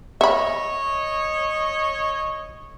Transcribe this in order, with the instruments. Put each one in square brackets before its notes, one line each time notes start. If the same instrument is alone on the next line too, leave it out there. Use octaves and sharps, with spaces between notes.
[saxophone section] C#5 D#5 [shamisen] E5 B5